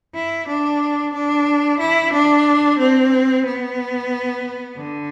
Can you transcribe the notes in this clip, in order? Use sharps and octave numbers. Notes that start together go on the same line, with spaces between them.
E4
D4
D4
E4
D4
C4
B3
D3